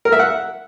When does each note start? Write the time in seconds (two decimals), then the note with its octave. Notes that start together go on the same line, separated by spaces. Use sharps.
0.05 A#4
0.12 E5
0.19 F#5